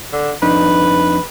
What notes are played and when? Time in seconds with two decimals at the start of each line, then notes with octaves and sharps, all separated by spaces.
0.13 D3
0.42 F2 D4 D#4 B4